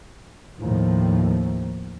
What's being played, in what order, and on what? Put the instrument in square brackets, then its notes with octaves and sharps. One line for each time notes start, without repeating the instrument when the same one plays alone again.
[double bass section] D#2 A2 D#3 F3